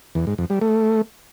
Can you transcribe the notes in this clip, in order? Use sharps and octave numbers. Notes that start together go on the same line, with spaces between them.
E2
G#2
F2
G3
A3